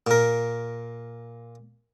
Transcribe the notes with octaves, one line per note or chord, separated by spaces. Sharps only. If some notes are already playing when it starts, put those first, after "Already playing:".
A#2 A#4